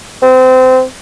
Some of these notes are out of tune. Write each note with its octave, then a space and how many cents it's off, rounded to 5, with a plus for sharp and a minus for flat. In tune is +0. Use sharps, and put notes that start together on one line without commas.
C4 -25